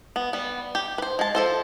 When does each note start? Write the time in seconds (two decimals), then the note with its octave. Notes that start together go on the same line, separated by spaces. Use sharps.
0.16 B3
0.33 G3 B3
0.75 G4
0.98 B4 C5
1.19 G#3 A5
1.35 F3 A4 C5